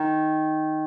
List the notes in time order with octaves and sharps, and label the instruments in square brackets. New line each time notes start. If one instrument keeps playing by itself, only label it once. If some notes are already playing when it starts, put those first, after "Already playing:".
Already playing: [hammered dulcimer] D#3